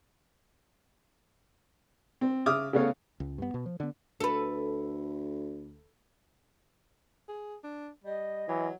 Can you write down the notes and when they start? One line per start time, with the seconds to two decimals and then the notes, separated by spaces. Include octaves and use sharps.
2.21 C4
2.46 C#3 E5 D6 D#6 F6
2.73 C#3 A3 B3 C#5 F5
3.20 C#2
3.38 G2 B3
3.54 B2
3.66 F3
3.80 D3 B3
4.20 D2 A4 B4
7.29 G#4
7.64 D4
8.04 G3 D#5
8.48 E3 F#3